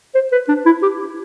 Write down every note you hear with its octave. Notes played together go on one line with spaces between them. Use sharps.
C5
B4
D4
E4
G4